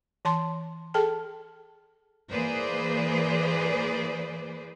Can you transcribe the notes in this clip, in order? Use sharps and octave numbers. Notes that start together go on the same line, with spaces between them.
E3 A5 C6
G#4 A4 G5 A5
E3 A#3 G#4 B4 C5 D5